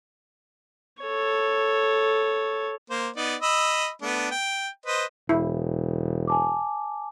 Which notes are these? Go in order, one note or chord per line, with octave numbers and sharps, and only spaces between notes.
A4 C#5
A#3 C5
B3 D#4 D5
D#5 B5 E6
A3 B3 D4
G5
B4 C5 D#5
E1 E4
G#5 A5 D6